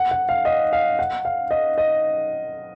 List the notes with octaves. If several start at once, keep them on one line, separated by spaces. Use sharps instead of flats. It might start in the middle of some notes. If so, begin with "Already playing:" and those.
Already playing: F#5
F#5
F5
D#5
F5
F#5
F5
D#5
D#5